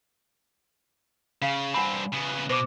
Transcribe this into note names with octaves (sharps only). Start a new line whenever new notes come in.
C#3 F5
G2 C4 F#5 G#5 B5
C#3 B3
B2 C5 D6